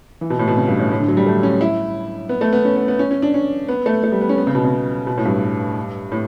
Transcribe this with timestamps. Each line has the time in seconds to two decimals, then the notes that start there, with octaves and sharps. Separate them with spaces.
0.21 E3
0.30 B2
0.39 A2
0.48 B2
0.57 C#3
0.68 G2
0.79 A2
0.91 A2
1.00 D3
1.08 F#3
1.17 G3
1.26 A3
1.43 C#4
1.61 E4
2.29 B3
2.41 A3
2.53 B3
2.65 C#4
2.76 B3
2.88 B3
2.99 C#4
3.11 C#4
3.22 D4
3.34 C#4
3.69 B3
3.86 A3
4.04 A3
4.12 G3
4.21 B3
4.29 C#4
4.38 B3
4.47 C#3
4.55 B2
4.65 C#3
5.07 B2
5.18 A2
5.25 G2
6.12 A2